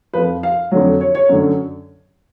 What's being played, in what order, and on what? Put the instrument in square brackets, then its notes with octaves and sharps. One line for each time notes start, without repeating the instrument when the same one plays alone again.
[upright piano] F2 F3 B4
F5
F2 D3 F#3
C#5
C#5
F#2 D3 F#3